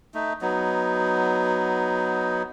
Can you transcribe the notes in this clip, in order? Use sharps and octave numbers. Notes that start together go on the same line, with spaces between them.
A3 D#4
F#3 B3 D#4